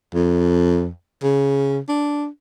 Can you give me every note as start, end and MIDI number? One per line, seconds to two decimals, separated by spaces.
0.14 0.89 41
1.23 1.79 49
1.88 2.26 62